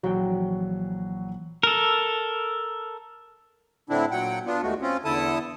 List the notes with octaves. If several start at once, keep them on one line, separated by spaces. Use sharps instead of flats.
A#1 E3 F#3 F#4 G5
A4 A#4
A2 D3 C4 D4 E4
A#2 F#3 F#5 G5
B3 D4 F4
D#2 G#3 A3 F#4
C4 C#4 F4
E2 D3 E4 A4 A5 D#6